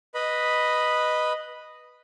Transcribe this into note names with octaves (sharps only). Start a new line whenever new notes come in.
B4 D#5 B5